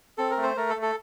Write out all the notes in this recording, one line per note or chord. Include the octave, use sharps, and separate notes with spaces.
C4 A4
A#4
A3
C5
A3 A#4
A4
A3
A4